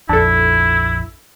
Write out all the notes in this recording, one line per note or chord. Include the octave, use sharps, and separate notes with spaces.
A#1 F2 D4 E4 A4